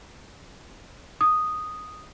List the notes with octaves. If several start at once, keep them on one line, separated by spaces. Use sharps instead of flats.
D#6